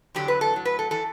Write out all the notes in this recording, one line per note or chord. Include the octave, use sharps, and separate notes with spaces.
E2 D3 F#3 G4
B4
A4
A2 F#3
B4
A4
E3 A4